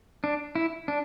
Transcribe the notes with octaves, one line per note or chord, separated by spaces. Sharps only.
D4
E4
D4